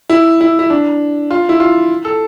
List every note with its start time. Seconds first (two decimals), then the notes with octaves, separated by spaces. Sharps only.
0.09 E4
0.41 E4
0.59 E4
0.70 D4
1.31 F4
1.49 E4
1.60 F4
2.05 A4